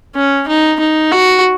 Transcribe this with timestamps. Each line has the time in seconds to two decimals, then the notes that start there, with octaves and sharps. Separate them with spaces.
0.16 C#4
0.48 D#4
0.80 D#4
1.12 F#4